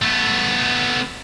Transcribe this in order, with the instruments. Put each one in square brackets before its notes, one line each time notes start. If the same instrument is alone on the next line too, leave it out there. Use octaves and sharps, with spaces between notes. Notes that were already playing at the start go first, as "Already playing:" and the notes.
[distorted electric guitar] A3 B3